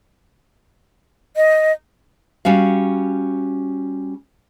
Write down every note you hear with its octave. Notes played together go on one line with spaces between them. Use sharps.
D#5
G3 C#4 F#4 F5